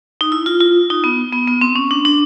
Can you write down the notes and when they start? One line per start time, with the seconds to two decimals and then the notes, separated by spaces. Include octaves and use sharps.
0.21 D#4
0.32 E4
0.46 F4
0.60 F4
0.90 D#4
1.04 B3
1.33 B3
1.47 B3
1.61 C4
1.76 C#4
1.91 D4
2.05 D4